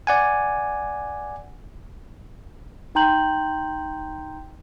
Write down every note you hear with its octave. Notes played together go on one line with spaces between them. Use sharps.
D5 F#5 G#5
D#4 G5 A#5 C6 G6 F#7